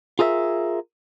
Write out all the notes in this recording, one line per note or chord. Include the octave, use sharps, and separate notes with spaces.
F4 G#4 A#4 D#5 E5